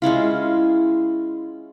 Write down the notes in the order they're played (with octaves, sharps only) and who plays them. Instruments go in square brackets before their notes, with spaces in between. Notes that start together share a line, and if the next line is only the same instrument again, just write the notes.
[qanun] G#3 C#4 E4 F4